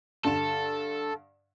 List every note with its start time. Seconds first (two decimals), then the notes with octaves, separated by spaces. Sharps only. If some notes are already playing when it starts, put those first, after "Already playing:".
0.25 G2 D3 A4 E7